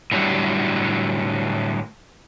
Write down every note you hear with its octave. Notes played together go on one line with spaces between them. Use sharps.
A2 D3 F#3 G3